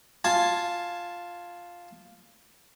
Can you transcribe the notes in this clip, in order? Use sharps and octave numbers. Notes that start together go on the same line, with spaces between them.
F4 G#5 A5